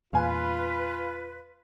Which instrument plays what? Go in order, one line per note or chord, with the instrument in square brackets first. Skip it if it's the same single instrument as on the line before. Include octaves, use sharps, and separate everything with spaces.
[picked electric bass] E2 A#2 [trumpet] F4 [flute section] B4 [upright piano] F5 G#5